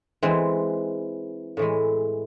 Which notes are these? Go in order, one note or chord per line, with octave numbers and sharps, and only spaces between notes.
E3 G#3 C4
A2 E3 G#3